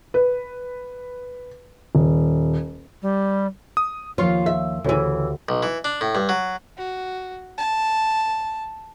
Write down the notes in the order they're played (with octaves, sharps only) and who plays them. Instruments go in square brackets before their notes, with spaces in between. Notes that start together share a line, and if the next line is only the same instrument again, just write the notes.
[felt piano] B4
D#1
[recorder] G3
[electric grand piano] D#6
[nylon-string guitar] D#2 F3 C#5 [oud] F4
[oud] E5
[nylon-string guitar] D2 G4 [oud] C#3 E3
[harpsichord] B1
E3
D4
A2
G2
F#3
[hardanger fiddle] F#4
A5